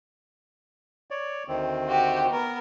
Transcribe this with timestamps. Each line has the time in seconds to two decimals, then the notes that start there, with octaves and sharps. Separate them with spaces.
1.11 C#5 D5
1.48 D2 D#3 C4
1.88 F#4 G4
2.27 B3 A#4